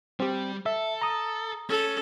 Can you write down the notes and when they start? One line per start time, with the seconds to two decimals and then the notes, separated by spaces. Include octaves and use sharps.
0.20 G3 C4 G4
0.66 A4 E5
1.02 A#5 D#6
1.70 C#4 A4